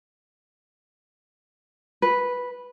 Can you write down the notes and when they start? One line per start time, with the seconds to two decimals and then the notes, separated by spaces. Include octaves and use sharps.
2.02 B4